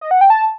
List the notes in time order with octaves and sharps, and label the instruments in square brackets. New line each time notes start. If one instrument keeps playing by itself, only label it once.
[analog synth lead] D#5
F#5
G5
A5